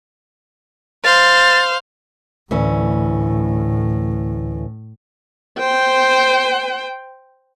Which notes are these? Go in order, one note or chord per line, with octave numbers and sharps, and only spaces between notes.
C5 F5 A6
D2 A2 E3 C#4
C5 G5